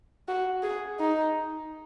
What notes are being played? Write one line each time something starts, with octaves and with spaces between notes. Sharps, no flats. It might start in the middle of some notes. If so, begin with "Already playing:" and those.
F#4
G#4
D#4